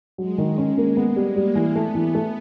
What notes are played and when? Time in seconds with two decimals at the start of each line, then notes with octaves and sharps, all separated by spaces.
0.18 F#3 G#3
0.38 D#3
0.58 G#3 C#4
0.78 A#3
0.97 B3
1.16 G3
1.36 G3 A#3
1.55 E3
1.75 A3 B3
1.95 E3
2.15 A3